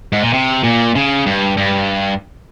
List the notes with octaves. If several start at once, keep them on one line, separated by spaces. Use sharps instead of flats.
G#2
A#2
C3
A#2
C#3
G2
G2